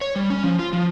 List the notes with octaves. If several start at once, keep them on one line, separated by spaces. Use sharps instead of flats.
C#5
G3
C#4
F3
F4
F3